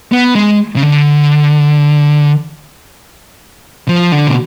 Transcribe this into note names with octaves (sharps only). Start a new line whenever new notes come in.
B3
G#3
C#3
D3
F3
D3
B2